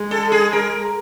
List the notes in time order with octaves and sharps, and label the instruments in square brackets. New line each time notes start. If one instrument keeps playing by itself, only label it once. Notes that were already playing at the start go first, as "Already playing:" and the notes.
Already playing: [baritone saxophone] G#3
[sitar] A4
G#4
A#4